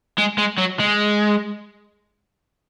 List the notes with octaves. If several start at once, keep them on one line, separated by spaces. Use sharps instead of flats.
G#3
G#3
F#3
G#3